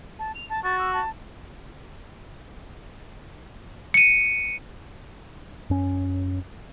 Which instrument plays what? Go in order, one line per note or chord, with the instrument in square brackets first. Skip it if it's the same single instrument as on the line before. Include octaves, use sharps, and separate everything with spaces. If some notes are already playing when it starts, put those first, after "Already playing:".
[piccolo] A5
F7
A5
[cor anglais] F#4 [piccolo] A6
[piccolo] E6
A5
[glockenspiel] C#7 D#7
[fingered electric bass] F#2 C#4